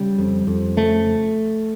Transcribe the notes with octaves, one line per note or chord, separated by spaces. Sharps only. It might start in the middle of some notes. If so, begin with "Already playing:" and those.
Already playing: C#3 G3
F2
F2
C#3 A3